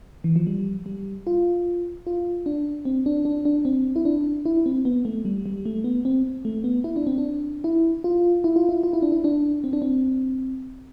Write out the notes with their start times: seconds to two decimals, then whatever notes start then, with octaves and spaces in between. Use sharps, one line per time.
0.24 E3
0.36 F3
0.47 G3
0.86 G3
1.27 F4
2.07 F4
2.46 D4
2.85 C4
3.06 D4
3.25 D4
3.45 D4
3.65 C4
3.96 E4
4.05 D4
4.45 E4
4.66 C4
4.85 B3
5.05 A3
5.25 G3
5.46 G3
5.65 A3
5.84 B3
6.05 C4
6.45 A3
6.64 B3
6.84 E4
6.96 D4
7.07 C4
7.18 D4
7.64 E4
8.04 F4
8.44 E4
8.56 F4
8.69 E4
8.83 F4
8.93 E4
9.02 D4
9.12 E4
9.24 D4
9.64 C4
9.73 D4
9.82 C4